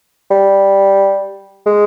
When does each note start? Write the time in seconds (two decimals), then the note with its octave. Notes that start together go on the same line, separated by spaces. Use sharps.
0.30 G3
1.66 G#3